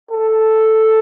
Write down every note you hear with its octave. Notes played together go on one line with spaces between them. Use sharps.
A4